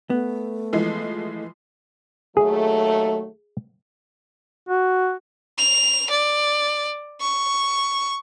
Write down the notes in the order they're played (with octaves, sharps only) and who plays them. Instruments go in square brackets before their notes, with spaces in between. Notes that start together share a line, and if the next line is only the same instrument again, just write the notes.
[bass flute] A3 [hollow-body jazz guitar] B3
[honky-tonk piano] E3 F3 G#3
[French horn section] D#2 F#3 A3 [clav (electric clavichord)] G#4
[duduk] F#4
[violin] F7
D5
C#6